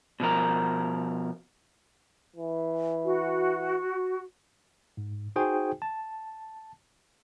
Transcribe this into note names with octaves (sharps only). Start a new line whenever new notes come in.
B2 F3 A#4
E3
F#4
G#2
D#4 F#4 G#4 C5 G5 G#5
A5